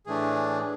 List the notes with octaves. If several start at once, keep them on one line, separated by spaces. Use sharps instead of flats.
A2 E3 A3 D4 G#4